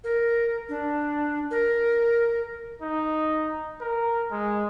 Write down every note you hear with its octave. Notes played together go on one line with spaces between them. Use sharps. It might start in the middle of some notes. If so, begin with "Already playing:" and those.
A#4
D4
A#4
D#4
A#4
G#3